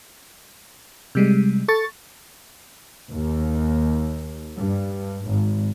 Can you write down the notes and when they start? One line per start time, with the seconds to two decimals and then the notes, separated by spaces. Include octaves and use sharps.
1.15 C3 G3 G#3
1.68 A4 C#6 A6
3.11 D#2
4.56 G2
5.29 G#1